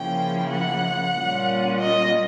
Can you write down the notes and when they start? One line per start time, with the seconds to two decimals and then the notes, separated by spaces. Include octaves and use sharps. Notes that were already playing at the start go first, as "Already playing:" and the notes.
Already playing: C#3 F3 A#3 C#4 E4 G5
0.49 F#5
1.14 A#2 G3 A#3 C#4 F4
1.80 D#5